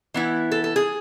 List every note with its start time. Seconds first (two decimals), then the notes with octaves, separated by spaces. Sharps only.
0.14 E3 B3 E4
0.52 A4
0.64 A4
0.76 G#4